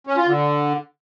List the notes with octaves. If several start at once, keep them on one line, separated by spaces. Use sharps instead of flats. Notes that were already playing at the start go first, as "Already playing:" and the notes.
C#4
F4
D3